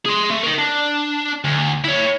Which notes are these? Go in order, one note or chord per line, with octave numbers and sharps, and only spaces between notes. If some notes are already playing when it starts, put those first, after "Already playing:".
G#4 C6
A3
A#4 D#5
D4
D2
E4 C#5